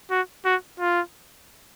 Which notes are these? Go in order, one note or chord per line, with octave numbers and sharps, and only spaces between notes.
F#4
F#4
F4